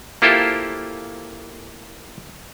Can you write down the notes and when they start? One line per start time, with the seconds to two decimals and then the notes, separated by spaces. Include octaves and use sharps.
0.22 A#3 E4 F4 G4 A4 C5